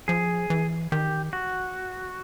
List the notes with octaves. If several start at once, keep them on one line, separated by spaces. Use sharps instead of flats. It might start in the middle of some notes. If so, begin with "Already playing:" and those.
F3 G#4
E3
D#3 G4
F#4